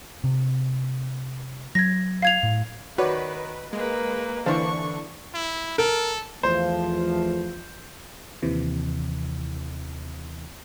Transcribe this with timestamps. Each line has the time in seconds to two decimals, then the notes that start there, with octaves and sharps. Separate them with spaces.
0.24 C3
1.75 F#3 G#6 A#6
2.22 F5 G#6 F7
2.43 A2
2.98 D#3 F#4 B4 C#5 D5
3.73 G#3 A#3 A#4 B4
4.46 D3 E3 D4 C5 F5 A5 C#6
5.35 E4
5.78 A4 A#4
6.43 E2 F3 A3 C5
8.42 D#2 C3 E3